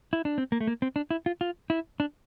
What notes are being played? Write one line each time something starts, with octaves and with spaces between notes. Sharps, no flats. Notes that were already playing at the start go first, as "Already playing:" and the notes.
E4
D4
C4
A#3
A3
A#3
C4
D4
E4
F4
F4
E4
D4